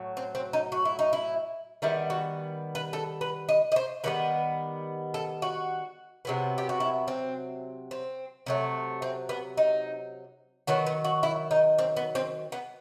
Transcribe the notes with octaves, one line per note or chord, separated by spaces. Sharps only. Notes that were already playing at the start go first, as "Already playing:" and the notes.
Already playing: A2 F#3
C4
C4
D#4
F#4
E4
D#4
E4
D#3 G3 B3 E4
F#4
B4
A4
B4
D#5
D#5
C5
D#3 G3 B3 B4
A4
F#4
C3 F#3 B3
G4
F#4
E4
C4
C4
C3 F#3 A3
C4
B3
D#4
D#3 F#3 B3 F#4
B3
F#4
E4
D#4
C4
B3
C4
B3